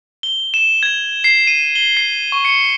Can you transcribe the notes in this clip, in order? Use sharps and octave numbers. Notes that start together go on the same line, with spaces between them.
G7
E7
G#6
C7
D#7
G7
C7
C#6
C#7